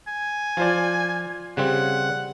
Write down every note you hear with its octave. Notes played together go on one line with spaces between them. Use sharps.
G#5
F3 F4 C5 D5
C#3 G3 C4 F#5